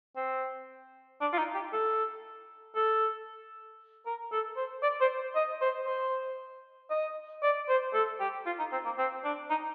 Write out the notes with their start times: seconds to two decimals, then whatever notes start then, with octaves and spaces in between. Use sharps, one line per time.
0.16 C4
1.21 D4
1.33 F4
1.38 D#4
1.54 G4
1.73 A4
2.75 A4
4.06 A#4
4.32 A4
4.56 C5
4.82 D5
5.01 C5
5.35 D#5
5.61 C5
5.86 C5
6.90 D#5
7.42 D5
7.69 C5
7.94 A4
8.19 G4
8.46 F4
8.59 D#4
8.72 C4
8.85 A#3
8.98 C4
9.24 D4
9.50 D#4